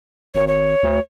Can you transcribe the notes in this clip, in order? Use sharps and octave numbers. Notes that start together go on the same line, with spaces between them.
G#1 C#5
C#5
D2